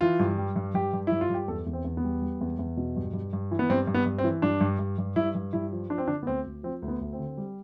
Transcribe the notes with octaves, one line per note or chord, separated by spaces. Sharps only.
E3 F4
G2
G3
G2
G2 G4
G2
G2 E4
F4
G2 G4
E2 A4
E2
C4
E2
B3
G3
G3
E2
E2
B2
G2
G2
G2
E3
B3
G2 C4
G2
B3
G2
C4
E3
G2 D4
G2
G2
G2
G2 E4
G2
G2 E4
F3
F3 D4
C4
D3 D4
B3
D2 C4
D2
F3 C4
D2
B3
D2
C4
D3
G3